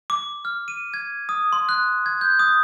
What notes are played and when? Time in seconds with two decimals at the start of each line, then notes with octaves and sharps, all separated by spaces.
0.10 D6
0.45 F6
0.68 D#7
0.94 G#6
1.29 D#6
1.53 C6
1.69 F#6
2.06 G#6
2.21 G6
2.39 D#6